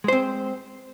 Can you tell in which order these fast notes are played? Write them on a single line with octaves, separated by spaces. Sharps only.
G#3 C5 C4